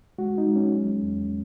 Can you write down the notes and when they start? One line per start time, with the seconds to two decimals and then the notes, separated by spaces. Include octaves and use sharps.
0.18 G#3 F#4
0.38 D#4
0.47 G#3
0.56 C#4
0.74 F#3
1.02 E2